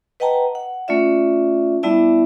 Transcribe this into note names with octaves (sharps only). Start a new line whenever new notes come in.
B4 D#5 F#5 G5 A5 A#5
F#5
A3 C#4 F4 D5 E5
G3 B3 E4 D5 E5 A5